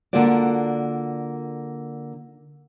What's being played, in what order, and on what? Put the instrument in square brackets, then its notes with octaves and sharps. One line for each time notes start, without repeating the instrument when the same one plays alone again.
[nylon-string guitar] D3 A#3 F4 F#4 D5